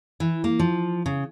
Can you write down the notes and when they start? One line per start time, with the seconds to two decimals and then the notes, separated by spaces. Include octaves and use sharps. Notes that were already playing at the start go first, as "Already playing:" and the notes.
0.20 E3
0.44 A#3
0.59 F3
1.06 C#3